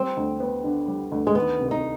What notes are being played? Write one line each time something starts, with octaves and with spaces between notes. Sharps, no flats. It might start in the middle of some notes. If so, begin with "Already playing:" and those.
Already playing: G3 C4
D2
B3
D3
G3
D2
G#3
D#3 B3
C2
D#4